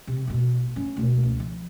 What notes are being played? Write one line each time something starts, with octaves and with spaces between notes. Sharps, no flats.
C3
A1 B2
F3 C#4
D2 B2
C#2
F3